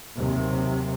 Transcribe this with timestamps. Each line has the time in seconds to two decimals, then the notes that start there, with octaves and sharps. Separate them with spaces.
0.17 D#2 C3 F#3